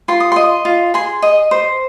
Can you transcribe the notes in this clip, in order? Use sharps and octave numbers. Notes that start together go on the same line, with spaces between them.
F4 C6
D#6
D#5 C6
F4
G#4 C6
D#5
C5